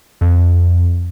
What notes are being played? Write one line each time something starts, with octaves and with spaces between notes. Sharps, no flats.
F2